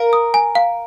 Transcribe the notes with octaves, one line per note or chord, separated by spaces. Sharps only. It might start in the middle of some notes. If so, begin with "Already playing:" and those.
Already playing: A#4 F5
D#6
G#5
F5